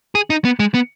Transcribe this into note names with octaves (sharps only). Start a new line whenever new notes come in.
G#4
D#4
B3
G#3
B3